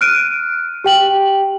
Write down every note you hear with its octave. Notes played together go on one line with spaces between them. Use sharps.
F6 F#6 D7 D#7
G4 G5 F#7